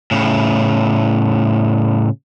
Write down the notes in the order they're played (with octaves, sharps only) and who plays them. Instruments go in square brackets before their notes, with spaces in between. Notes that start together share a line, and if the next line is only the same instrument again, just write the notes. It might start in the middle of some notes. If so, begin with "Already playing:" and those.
[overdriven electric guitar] A2 C#3